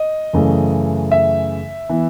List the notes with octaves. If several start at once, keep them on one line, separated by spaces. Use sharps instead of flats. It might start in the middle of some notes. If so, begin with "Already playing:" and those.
Already playing: D#5
F#2 C#3 E3 A3
E5
E3 B3